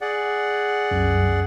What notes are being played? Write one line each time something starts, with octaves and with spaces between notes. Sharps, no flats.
G#4 D5 F#5
C2 F#2